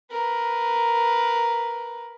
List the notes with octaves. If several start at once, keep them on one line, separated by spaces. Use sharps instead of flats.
A#4 B4